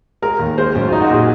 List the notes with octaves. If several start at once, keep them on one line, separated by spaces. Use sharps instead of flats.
G#3 A#4
D#2
G#3 C5
F#2
D#4 F4
F#4
A#2 G#4